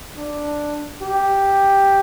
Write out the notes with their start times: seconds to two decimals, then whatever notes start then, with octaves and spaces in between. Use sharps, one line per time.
0.17 D4
1.02 G4